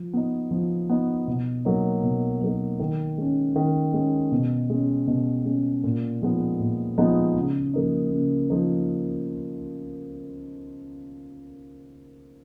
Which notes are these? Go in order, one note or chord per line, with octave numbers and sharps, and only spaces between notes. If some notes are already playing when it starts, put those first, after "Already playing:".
Already playing: F3
B3 D#4
F3
B3 D#4
B2
F#3 A#3 D#4
B2
F#3 A#3 D#4
D#3
G#3 C#4
D#3
G#3 C#4
B2
G#3 C#4
B2
G#3 C#4
A#2
F3 G#3 B3 D#4
A#2
F3 G#3 B3 D#4
C#3
F3 A#3 D#4
C#3
F3 A#3 D#4